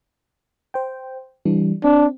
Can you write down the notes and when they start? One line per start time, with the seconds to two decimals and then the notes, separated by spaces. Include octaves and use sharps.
0.74 C5 G5
1.45 E3 G3 D4
1.84 C4 D4